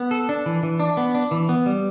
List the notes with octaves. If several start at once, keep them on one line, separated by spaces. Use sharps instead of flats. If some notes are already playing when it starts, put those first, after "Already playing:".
Already playing: B3
A4
D4
E3
E3
D4
B3
D4
E3
B3
G3